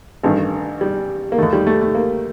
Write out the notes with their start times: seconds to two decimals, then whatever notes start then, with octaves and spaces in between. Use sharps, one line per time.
0.23 A1 G2 D#3 A3
0.81 G3
1.32 A#3
1.38 D#2 D#3 A3
1.53 G3
1.67 A3
1.81 A3
1.95 A#3